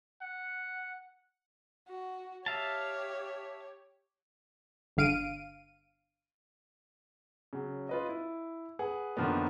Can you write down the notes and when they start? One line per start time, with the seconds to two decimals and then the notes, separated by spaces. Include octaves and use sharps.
0.22 F#5
1.88 F#4
2.46 G4 C#5 E5 F5 A5
4.97 G1 D3 F5 D7 D#7
7.53 C#3 F#3
7.89 F4 B4 D#5
8.09 E4
8.79 G#4 B4 F#5
9.17 F#2 D3 D#3 F3 A#3 B3